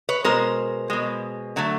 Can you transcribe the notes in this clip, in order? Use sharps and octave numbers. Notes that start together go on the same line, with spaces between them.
B4 C#5
B2 G#3 A#4 C5
B2 G#3
D3 F#3 A3